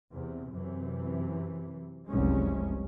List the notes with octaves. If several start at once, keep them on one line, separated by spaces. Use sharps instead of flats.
E2 C3
F#2 C3 E3
F1 C2 F#2 G#3 C#4